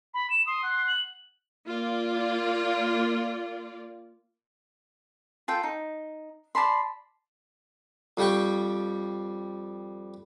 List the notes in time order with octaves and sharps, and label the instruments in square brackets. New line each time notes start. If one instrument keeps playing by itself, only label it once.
[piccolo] B5
E7
[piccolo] C6 [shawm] D#6
[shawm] F#5
[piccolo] F#7
[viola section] A#3 F4 D5
[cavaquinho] F4 A4 G5
D#4
D5 A5 B5 C6
[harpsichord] F2 G3 G5 C#6